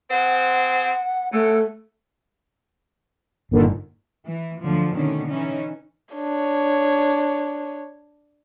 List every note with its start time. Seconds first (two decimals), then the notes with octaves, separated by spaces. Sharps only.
0.10 C4 G#4 C5 F#5
1.33 C#3 A3 B3 A4
3.51 G1 G2 A#2 D3 D#3
4.26 E3
4.63 D2 D3 F3 F#3
4.95 B2 D3 D#3 A3 C#4
5.29 E3 C#4 D#4
6.15 D4 C#5